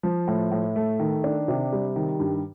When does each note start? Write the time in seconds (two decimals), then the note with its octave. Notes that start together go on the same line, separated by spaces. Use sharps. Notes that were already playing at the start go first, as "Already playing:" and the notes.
0.03 F3
0.27 A2
0.51 A2
0.76 A3
0.99 D#3
1.24 D4
1.48 C3
1.72 G3
1.96 D#3
2.20 G2